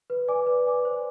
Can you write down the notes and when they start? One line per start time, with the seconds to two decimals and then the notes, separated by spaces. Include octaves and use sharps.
0.10 B4
0.28 D5 G#5 D6
0.47 B4
0.66 D5 G#5 D6
0.85 C5